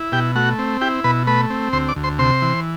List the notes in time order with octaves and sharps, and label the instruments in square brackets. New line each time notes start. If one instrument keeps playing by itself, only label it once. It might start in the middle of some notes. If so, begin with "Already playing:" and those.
Already playing: [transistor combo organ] E4
B2 G4 G5
A3 F#4 F#5
C4
E4 G4 G5
B2 B4 B5
A3 B4 B5
C4
D2 C5 C6
D5 D6
D2
C5 C6
C3 C5 C6
E3